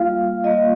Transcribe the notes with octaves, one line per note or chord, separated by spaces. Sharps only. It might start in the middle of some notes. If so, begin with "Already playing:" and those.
Already playing: G3 A#3 F4 F5
G3 A#3 F4 D#5